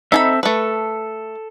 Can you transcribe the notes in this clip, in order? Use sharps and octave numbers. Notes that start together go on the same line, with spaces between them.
C4 D#4 A4 E5 G#5 B5
A3 A4 B4